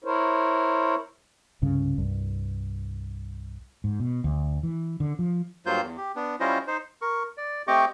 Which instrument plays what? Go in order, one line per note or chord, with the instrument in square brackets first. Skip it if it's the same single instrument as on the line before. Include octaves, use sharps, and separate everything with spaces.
[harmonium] E4 A#4 C5 C#5
[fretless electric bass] C2 G2 C#3 C#4
C2 G2
G#2
B2
D2
E3
D3
F3
[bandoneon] G2 F#3 A#3 F4 C5 G6
E2
G4
B3 D4
G3 C#4 E4 F4 C5 D#5
D#4 C5
[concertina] A#4 C#6
D5
A3 C4 G4 D#5 C#6 D6